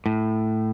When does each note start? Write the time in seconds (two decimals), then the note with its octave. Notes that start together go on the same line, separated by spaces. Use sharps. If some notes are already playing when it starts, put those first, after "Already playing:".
0.06 A2